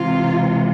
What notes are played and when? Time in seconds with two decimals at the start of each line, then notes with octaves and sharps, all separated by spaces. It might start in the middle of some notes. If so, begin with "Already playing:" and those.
Already playing: C3 E3 G#3 F4